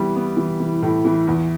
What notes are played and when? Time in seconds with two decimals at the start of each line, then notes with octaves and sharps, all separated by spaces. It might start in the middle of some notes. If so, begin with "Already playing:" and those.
Already playing: E3 G3 B3
0.15 B3
0.37 E3
0.60 E3
0.82 A2
1.05 E3
1.27 E2